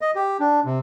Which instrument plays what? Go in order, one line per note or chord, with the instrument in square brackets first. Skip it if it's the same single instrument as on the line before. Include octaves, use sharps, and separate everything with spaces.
[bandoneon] D#5
G4
D4
C3